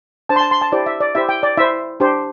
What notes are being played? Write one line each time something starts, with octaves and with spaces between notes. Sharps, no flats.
D4 C5 A5
C6
A5
C6
A5
E4 G4 C5 D5
E5
D5
E4 G4 C5 E5
G5
D5
E4 C5 E5
D4 G4 C5